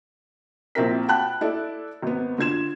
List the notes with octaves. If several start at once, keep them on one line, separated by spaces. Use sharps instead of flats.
A#1 C4 E4 A#4 B6
F#5 G5 A5 B5 F#6
E4 A4 D5
G#1 B3
D3 F4 G#6 E7